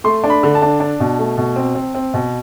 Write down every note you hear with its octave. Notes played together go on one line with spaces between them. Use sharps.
A3 C6
D4
B5
D3
A5
D4
D4
B2
A3
B2
C4
C4
C4
B2